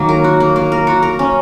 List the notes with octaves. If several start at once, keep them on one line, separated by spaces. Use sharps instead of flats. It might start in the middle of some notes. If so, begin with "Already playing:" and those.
Already playing: D#3 F#3 A#3
A#4
F#4
A#3
A#3
A#4
F#4
A#4
C#4